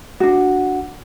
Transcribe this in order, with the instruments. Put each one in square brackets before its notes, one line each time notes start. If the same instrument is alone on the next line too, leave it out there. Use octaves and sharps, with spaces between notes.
[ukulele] D4 F#4